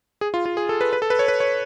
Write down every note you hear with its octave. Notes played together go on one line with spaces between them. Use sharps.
G#4
F4
F4
G#4
A4
B4
B4
A4
B4
C#5
B4
C#5